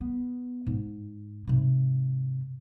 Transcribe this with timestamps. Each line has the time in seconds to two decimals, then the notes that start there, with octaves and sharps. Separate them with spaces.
0.01 B3
0.67 G#2
1.47 G#2 C3